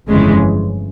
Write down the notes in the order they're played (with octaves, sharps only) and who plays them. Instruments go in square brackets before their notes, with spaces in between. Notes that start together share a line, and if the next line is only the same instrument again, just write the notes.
[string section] G1 F2 C#3 E3 G#3